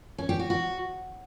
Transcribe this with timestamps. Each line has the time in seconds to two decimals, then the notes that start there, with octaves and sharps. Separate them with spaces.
0.18 C#4
0.29 G4
0.39 F#4
0.50 F#4